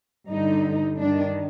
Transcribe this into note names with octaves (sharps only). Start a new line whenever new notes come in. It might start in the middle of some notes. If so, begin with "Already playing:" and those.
G2 D3 D#4
G2 D#3 D4